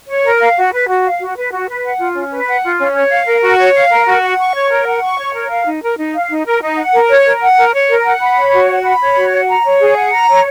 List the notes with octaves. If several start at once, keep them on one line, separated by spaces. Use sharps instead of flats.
C#5
A#4
F5
F#4
B4
F#4
F5
F#4
B4
F#4
B4
F#5
F4
C#4
B4
F#5
F4
C#4
C#5
F5
A#4
F#4
C#5
F5
A#4
F#4
F#5
C#6
C#5
A#4
F#5
C#6
C#5
A#4
F5
D#4
A#4
D#4
F5
D#4
A#4
D#4
F#5
A#4
C#5
A#4
F#5
A#4
C#5
A#4
F#5
B5
C#5
F#4
F#5
B5
C#5
F#4
F#5
A#5
C#5
G#4
F#5
A#5
C#5